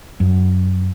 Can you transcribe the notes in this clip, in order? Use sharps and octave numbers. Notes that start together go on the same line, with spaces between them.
F#2